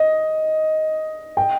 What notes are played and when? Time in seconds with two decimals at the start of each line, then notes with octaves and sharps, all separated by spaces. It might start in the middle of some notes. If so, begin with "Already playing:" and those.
Already playing: D#5
1.37 G5